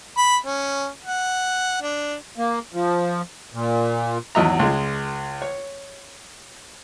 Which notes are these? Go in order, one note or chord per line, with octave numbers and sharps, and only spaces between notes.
B5
C#4
F#5
D4
A#3
F3
A#2
G#1 E2 F#3 D#5 E5 A#5
C#2 G#3
C#5